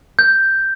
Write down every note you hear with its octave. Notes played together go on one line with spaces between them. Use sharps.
G6